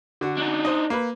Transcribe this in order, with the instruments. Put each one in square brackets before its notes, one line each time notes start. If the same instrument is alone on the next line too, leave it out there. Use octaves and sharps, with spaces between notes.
[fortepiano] D3 F#4
[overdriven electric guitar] D4 D#4
[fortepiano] C5 D#5
A#3 B4